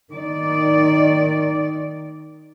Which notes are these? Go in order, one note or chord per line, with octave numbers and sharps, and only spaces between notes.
D#3 D5